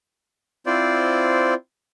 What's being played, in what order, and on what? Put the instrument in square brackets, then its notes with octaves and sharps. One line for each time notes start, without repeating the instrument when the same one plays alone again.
[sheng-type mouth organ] C4 E4 F4 C5 D5